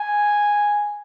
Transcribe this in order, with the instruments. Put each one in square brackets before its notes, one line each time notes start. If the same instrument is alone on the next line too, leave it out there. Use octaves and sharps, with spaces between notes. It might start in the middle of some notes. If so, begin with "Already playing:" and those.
Already playing: [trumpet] G#5